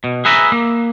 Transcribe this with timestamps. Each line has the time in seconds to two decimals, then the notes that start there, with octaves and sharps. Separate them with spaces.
0.04 B2
0.25 G#4 B4 E5 A#5
0.52 A#3